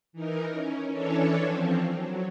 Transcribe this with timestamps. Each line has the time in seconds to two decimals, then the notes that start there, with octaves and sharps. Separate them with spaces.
0.13 E3 D#4 A#4
0.50 C#4
0.91 E3 C#4 D4 A4 C#5
1.38 F3 C4
1.91 F#3